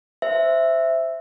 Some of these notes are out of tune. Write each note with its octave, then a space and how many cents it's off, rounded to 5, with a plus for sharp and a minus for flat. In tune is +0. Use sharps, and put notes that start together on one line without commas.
C5 +0 E5 +0